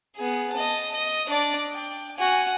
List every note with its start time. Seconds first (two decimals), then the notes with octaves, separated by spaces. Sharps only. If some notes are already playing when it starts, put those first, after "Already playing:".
0.16 B3 G#4
0.53 D#5 A5
0.94 D#5
1.29 D4 D5
1.73 G5
2.17 F#4 G#5